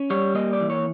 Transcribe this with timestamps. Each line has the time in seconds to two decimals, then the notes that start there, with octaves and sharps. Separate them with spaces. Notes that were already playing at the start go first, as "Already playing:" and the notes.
Already playing: C#4
0.10 G3 C#5
0.35 A#3 D#5
0.53 D5
0.61 E3
0.70 C#5